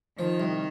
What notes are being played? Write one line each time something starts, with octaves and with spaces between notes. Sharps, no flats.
D#3 F3
C2